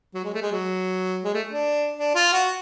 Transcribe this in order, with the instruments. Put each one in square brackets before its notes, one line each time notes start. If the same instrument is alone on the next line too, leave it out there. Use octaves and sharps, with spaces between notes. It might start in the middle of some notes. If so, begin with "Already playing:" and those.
[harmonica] F#3
G#3
A3
G#3
F#3
G#3
A3
D4
D4
F4
F#4